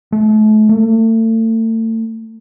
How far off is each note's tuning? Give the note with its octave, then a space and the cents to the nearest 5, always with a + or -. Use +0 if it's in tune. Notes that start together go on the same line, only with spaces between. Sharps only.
A3 -35
A3 +35